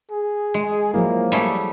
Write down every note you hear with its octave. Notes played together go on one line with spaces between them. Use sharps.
G#4
G#3
F3 F#3 A#3 E4
G3 A3 G#4